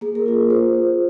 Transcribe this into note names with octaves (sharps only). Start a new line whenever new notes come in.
A#3 G#4
A#4
F4 G#4
F4 C5